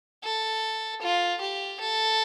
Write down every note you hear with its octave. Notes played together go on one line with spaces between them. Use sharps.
A4
F4
G4
A4